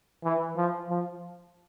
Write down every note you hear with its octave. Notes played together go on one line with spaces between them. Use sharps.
E3
F3
F3